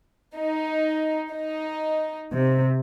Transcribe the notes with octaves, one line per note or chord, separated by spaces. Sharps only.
D#4
D#4
C3